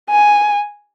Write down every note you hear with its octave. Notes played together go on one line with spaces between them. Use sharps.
G#5